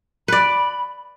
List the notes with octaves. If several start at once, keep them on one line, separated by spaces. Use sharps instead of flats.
B4 D5 B5